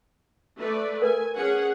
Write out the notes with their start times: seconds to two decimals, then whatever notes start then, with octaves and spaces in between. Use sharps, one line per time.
0.59 A3 B4 D5
1.02 A#4 B4 G#5
1.37 C#4 G#4 F#5